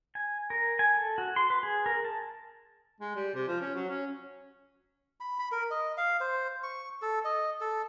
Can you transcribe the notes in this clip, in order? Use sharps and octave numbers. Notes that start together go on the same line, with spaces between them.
G#5
A#4
G#5
A4
F#4
C6
B4
G#4
A#4
A5
G#3
G3
C3
F3
C#4
F#3
C#4
B5
B5
A#4
D#5
F5
C5
C#6
A4
D#5
A4